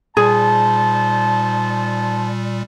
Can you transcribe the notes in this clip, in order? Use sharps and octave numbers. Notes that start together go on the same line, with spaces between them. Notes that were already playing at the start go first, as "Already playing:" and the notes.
A#2 G3 D#4 G#4 C5 A5